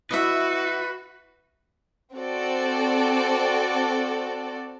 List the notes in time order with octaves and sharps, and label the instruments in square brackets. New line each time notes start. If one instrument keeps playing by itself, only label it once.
[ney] E4 [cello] F#4 [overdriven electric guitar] B4 [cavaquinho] D#5 E5
[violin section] C4 F#4 A4 D5